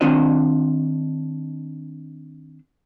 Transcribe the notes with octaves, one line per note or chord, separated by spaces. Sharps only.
D#3 C4 D4 F4 C5 D#5